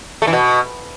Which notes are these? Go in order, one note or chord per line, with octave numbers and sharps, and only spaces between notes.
A3
E3
B2